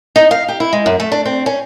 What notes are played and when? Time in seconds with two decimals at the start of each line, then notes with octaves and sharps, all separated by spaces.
0.16 D#4
0.31 F5
0.48 G4
0.60 E4
0.73 G#3
0.86 F#2
1.00 A3
1.12 D4
1.25 C4
1.46 C#4